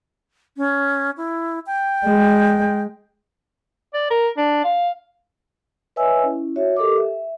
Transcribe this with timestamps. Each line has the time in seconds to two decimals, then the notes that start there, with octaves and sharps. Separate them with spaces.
0.57 C#4
1.17 E4
1.66 G5
2.06 G#3
3.94 D5
4.10 A#4
4.37 D4
4.64 F5
5.96 B4 C#5 D#5 E5 G#5 E6
6.23 C#4 E4
6.56 F#4 C#5 E5
6.77 G4 A4 A#4 D#5 D6
6.97 E5